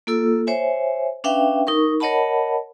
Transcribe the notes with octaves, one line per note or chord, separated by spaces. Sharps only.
A#3 F4 A4 E6
C5 C#5 E5 G#5
C#4 D4 B4 E5 F5 G5
D#4 A#4 C#6
A#4 C#5 D#5 F#5 A5 B5